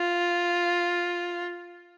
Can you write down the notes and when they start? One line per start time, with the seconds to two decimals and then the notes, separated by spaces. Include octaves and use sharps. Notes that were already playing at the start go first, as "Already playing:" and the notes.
Already playing: F4